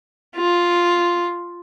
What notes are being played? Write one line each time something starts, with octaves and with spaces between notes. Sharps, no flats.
F4